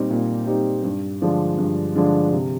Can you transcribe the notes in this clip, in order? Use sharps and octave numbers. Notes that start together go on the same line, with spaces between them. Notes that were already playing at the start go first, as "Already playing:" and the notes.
Already playing: A#2 G3 C4 D#4 G4
A#2
G3 C4 D#4 G4
G2
D3 F3 G#3 D4
G2
D3 F3 G#3 D4
C3